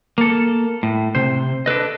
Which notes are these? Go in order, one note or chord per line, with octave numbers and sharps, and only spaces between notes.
A#3 A4
A2
C3 C5
D4 A4 B4 D#5